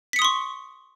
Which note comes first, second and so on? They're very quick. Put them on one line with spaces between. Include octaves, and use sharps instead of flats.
B6 C#7 D#6 C6 C#6